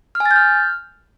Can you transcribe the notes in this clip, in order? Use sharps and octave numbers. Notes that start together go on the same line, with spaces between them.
F6
G#5
A6
G6
F6